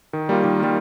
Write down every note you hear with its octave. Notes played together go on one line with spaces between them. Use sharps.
D#3
G3 A#3 F4
D#3
G3 A#3 F4